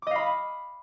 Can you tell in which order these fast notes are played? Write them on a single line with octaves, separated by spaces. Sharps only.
D6 D#5 F5 B5